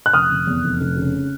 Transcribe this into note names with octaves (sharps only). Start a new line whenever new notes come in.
F#6
F1 D#6 F6
F1
E2
F1
F1
C#3